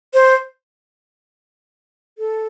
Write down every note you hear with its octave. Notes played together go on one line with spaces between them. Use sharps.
C5
A4